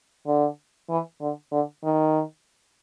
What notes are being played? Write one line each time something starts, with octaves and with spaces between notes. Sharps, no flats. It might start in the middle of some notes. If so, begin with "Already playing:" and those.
D3
E3
D3
D3
D#3